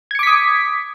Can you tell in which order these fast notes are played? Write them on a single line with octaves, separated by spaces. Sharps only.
G#6 C#7 D6 B6 D#6